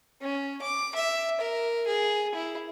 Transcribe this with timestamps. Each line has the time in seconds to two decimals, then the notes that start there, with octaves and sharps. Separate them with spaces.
0.22 C#4
0.62 D6
0.95 E5
1.41 A#4
1.87 G#4
2.35 E4